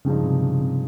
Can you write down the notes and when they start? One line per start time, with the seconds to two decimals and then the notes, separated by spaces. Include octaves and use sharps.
0.05 G2 C#3 F3 G#3 D#4
0.24 C3
0.42 C#3
0.61 C3